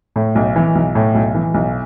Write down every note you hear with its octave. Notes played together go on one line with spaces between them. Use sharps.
A2
B1
E3
B1
A2
B1
E3
B1